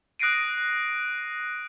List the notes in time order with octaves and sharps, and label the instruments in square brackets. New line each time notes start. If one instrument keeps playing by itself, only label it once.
[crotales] D#6 F#6 A#6 C7 D7 D#7